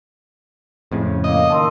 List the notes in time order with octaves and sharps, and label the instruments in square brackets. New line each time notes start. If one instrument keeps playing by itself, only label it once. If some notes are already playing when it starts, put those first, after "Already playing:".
[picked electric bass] F2 A2 C#3
[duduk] A#3 [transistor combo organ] D#5
[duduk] D#3 [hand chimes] A5 C6 E6